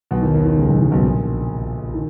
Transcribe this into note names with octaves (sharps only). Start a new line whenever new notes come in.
B1 B2
D#2 D#3
D#2 D#3
D#2 D#3
C#2 C#3
B1 B2
D#2 D#3
B1 B2
A#1 A#2
D#3